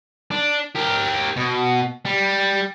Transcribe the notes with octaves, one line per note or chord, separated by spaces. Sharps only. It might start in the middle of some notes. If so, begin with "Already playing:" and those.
D4
G4 A#4
B2
G3